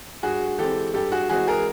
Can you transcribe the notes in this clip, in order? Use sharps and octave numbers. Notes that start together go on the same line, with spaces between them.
G2 F#4 G#4
E3 G#3 C4 G4 A4
G2 G4 A4
F#4 G#4
E3 G#3 C4 F#4 G#4
G#4 A#4